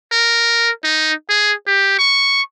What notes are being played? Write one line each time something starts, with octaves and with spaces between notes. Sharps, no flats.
A#4
D#4
G#4
G4
C#6